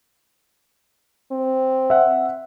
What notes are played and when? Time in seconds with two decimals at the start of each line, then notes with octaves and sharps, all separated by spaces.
1.31 C4
1.90 E5 F#5